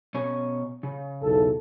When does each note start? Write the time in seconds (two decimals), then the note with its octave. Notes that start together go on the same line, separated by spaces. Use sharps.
0.14 B2 C#4 C#5
0.83 C#3
1.21 B1 E2 A4